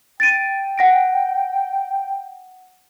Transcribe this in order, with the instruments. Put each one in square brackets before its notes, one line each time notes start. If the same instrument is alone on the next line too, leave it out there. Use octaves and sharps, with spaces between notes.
[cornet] G5 [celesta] A6 D7 D#7
[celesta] F#5 A#6 D7